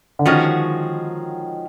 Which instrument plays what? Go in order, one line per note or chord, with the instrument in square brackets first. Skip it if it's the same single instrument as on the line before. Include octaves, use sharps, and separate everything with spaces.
[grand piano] D3
[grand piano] D#3 [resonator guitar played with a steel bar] F3 G#3 C#4 F#4